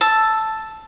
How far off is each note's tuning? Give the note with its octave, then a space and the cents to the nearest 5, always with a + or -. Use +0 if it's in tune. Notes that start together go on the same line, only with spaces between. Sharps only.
A5 +0 E6 +5